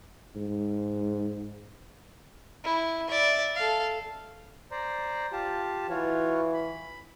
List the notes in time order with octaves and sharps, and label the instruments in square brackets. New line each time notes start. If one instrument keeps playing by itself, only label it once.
[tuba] G#2
[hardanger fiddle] E4
D5 E5
A4 F5
[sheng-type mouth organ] C5 D5 A#5
F4 G4 A5
[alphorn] E3 [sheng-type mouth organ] F4 F#4 C#5
[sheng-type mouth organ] B5